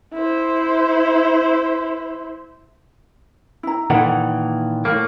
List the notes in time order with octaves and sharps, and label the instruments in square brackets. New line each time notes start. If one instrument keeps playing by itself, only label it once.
[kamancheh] E4 C5
[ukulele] E4 A#5
[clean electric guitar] A#2 D#3 E3 [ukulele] A4 E5 F#5
[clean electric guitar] A2 A#3